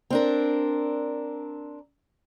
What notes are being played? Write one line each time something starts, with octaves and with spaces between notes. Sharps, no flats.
C4 D4 A#4